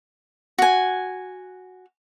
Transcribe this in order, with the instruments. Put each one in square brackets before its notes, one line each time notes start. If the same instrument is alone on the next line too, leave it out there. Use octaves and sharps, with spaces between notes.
[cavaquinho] F#4 G#5